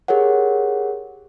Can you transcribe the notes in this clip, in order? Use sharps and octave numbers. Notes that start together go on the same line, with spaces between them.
G4 G#4 A#4 C#5 F#5